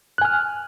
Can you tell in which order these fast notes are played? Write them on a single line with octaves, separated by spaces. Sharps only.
F#6 G#5 F6